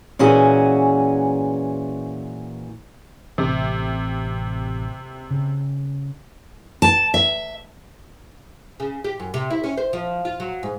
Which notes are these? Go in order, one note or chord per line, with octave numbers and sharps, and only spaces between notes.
A#2 E3 C#4 F#4 G#4
A1 C3 E3
C#3
A5
E5
C#3
G4
F#2
C3
E4
C#4
C5
F3
F4
F#3
G#2